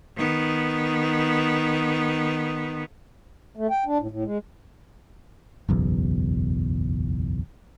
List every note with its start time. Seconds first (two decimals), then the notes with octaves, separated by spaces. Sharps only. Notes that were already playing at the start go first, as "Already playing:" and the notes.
0.16 D#3 B3
3.56 A3
3.71 G5
3.86 D4
3.99 A2
4.11 A2
4.25 G#3
5.69 F#1 B1 E2